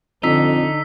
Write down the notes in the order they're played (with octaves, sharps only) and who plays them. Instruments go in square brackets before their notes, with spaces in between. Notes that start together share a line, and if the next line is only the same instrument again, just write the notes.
[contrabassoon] F2 [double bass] D3 [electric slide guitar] D#4 [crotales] E6 B6